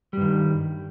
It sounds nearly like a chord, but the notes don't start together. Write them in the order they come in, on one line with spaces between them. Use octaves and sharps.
G3 G2 D#3